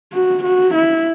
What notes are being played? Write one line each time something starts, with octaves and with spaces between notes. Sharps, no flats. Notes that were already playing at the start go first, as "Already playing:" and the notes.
F#4
F#4
E4